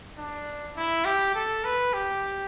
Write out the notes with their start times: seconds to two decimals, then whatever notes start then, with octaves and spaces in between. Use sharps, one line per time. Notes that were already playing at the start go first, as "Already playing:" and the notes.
0.18 D4
0.77 E4
1.05 G4
1.35 A4
1.64 B4
1.94 G4